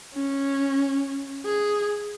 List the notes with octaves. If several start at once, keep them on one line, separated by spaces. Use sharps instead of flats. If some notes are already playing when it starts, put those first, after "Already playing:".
C#4
G#4